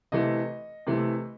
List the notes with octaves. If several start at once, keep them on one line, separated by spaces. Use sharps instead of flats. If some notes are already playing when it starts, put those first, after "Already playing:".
C3 E3 A3 D#5
C3 E3 A3